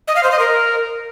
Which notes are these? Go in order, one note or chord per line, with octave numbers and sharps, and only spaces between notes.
D#5
F5
C5
D#5
A#4